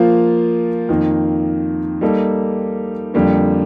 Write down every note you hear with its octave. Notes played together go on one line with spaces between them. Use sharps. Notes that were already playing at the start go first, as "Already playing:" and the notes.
Already playing: F3 A#3 F4
F2 D#3 A#3
G3 A#3 D#4 A4
F2 D3 G3 A#3